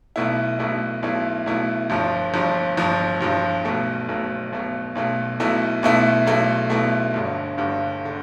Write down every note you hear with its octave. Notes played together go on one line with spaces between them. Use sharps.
B1 B2 A3 E4
B1 B2 A3 E4
B1 B2 A3 E4
B1 B2 A3 E4
G1 G2 F3
G1 G2 F3
G1 G2 F3
G1 G2 F3
B1 B2 A3
B1 B2 A3
B1 B2 A3
B1 B2 A3
B1 B2 A3 E4
B1 B2 A3 E4
B1 B2 A3 E4
B1 B2 A3 E4
G1 G2 D3
G1 G2 D3
D3